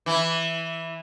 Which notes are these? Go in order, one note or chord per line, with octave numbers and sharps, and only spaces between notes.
E3 E4